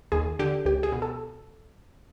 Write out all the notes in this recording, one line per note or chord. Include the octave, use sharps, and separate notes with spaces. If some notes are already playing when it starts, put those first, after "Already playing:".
D#2 G#4
D3 G4
C#2 G4
G#4
B2
A4